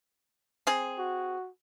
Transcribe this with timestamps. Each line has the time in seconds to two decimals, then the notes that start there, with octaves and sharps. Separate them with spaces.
0.67 C4 G#4
0.99 F#4